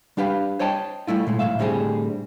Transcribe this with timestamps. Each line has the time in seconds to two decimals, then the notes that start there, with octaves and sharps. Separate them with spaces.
0.17 G3 D4 G4 B4 F5
0.59 C5 C#5 D#5 G5 A5
1.07 G3 A3 E4 F4
1.27 A#2 G#3 A3
1.39 B1 A2 E3 E5 F5
1.59 A2 D3 G3 C4 F#4 G#4